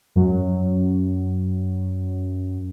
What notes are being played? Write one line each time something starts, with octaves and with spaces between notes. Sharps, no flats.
F#2 F#3